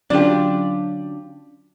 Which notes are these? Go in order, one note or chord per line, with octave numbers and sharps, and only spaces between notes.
D3 F#3 C#4 D4 F4 G4 D5